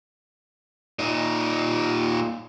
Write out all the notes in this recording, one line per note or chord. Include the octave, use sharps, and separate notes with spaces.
A#2 D#4